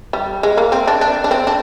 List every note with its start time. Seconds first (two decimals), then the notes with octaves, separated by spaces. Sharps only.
0.13 G3
0.43 G#3
0.57 A#3
0.72 C4
0.87 D4
1.01 D4
1.24 D4
1.31 C4
1.47 D4